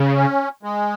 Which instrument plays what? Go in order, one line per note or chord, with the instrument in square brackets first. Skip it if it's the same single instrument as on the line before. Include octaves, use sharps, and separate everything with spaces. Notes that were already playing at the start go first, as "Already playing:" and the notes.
Already playing: [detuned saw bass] C#3
[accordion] C#4
G#3